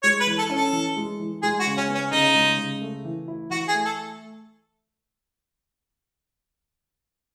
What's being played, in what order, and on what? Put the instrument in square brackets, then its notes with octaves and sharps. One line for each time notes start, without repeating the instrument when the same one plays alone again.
[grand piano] G#3 [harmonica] C#5
[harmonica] B4
[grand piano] E3
[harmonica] A4
[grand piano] C#4
[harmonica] A4
[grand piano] E3
G#3
E3
[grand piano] G#3 [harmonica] G#4
[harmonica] F#4
[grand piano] C#3
[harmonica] C#4
[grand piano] B3
[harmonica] C#4
[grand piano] C#3 [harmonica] D#4
[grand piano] G#3
C#3
A3
E3
E4
[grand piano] E3 [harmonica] F#4
[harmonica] G#4
[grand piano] A3
[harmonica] A4